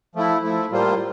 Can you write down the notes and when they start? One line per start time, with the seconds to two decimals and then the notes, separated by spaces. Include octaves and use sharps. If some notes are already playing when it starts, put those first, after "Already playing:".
0.15 F3 A3 E4
0.43 F3 A3 E4
0.71 A2 G3 A#3 F4 C5